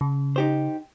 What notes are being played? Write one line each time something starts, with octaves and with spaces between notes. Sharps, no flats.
C#3
D#4 G4 C5